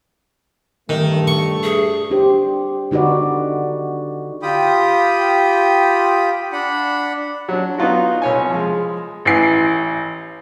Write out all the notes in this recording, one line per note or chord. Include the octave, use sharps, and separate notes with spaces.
G2 D#3 A3
C#6
G#4
D4 G4 C5
D3 D#4 F#4 B4 D5
F4 G4 G5 B5 D#6
D4 F#5 B5
F#3 D4
B3 D#4 F4 F#4
C2 C#5 G#5
F3 G#3
A1 E4 G#5 C7